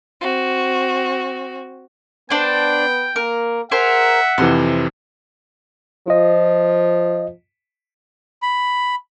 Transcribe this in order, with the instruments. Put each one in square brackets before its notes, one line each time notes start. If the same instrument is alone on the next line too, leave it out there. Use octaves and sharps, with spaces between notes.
[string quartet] C4 F#4
[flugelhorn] B3 [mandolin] D4 C5 [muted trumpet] G5
[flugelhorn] A#3 [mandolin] A#4
[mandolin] G#4 A#4 C5 [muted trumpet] E5 [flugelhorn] F#5
[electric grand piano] F2 C3 E3 [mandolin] C5
[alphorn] F3 [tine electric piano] F4 D#5
[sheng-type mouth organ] B5